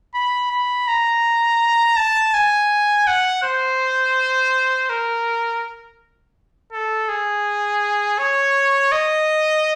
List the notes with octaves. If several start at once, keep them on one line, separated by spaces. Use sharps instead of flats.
B5
B5
A#5
A5
G#5
F#5
C5
A#4
A4
G#4
C#5
D#5